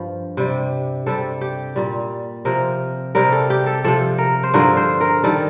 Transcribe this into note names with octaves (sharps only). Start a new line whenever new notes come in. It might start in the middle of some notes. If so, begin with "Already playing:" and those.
Already playing: G2 F3
C3 G3
C3 G3 A4
G4
A#2 G3
C3 F3 A#4
C3 G3 A#4
A4
G4
A4
C3 F3 A4
A#4
C5
G2 D3 F3 A#4
C5
A#4
D#3 G3 A4